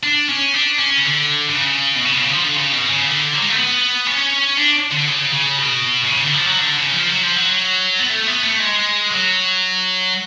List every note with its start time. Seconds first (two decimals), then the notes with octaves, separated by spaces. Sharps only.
0.03 D4
0.29 C#4
0.54 D4
0.79 C#4
0.97 C#3
1.04 D3
1.49 D3
1.55 C#3
1.96 B2
2.05 C#3
2.13 B2
2.18 C#3
2.30 F3
2.43 D3
2.56 C#3
2.72 B2
2.90 C#3
3.07 D3
3.34 F#3
3.42 G#3
3.49 A3
3.56 B3
4.07 C#4
4.57 D4
4.91 D3
5.07 C#3
5.33 C#3
5.58 B2
6.04 B2
6.08 C#3
6.21 D3
6.34 F3
6.46 F#3
6.59 D3
6.76 C#3
6.93 F3
7.09 F#3
7.23 F3
7.36 F#3
8.00 B3
8.10 A3
8.27 B3
8.44 A3
8.60 G#3
9.10 F#3